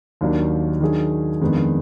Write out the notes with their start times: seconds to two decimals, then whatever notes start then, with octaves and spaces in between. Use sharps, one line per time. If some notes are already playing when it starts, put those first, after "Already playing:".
0.21 D#2 D#3 F#3 A#3 D4
0.81 D#3 F#3 D4 G#4
1.41 F2 D#3 G#3 B3 D4